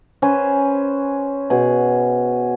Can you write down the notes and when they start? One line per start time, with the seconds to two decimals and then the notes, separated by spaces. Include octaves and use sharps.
0.22 C#4 B4 C5 G#5
1.50 B2 G#4